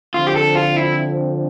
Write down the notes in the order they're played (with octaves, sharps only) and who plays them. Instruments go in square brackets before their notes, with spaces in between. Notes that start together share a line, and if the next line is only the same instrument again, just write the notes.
[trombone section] D3 F3 C4 [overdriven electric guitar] F4
[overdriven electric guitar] G4
A4
F4
E4